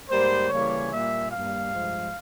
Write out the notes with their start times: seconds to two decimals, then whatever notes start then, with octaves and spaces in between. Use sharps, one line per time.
0.08 G#2 G3 A#3 C5
0.49 C#3 E3 G3 A#3 C#5
0.91 A#2 G3 A#3 E5
1.31 G2 G3 A#3 F5
1.73 G2 F3 G#3